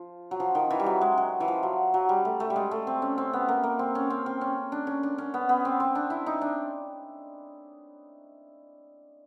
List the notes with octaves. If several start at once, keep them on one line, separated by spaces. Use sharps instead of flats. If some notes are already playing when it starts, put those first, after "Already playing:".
Already playing: F3
F#3
F3
D#3
E3
G3
F#3
G#3
F#3
E3
F3
F#3
F#3
G3
A3
A3
G3
G#3
A3
C4
C#4
C4
B3
A#3
A#3
C4
C#4
C4
C4
C#4
D4
C#4
D4
C#4
B3
B3
C4
C4
D4
E4
D#4
D4